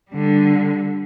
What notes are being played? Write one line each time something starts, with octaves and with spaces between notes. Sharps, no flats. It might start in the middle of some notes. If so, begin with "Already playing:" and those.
D3 G3